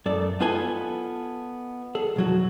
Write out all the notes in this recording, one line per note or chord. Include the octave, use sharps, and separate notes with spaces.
F#2 A4 D5
B3 D#4 F4 A4 B4 G#5
G#4 A4
B1 F2 F#3 F#4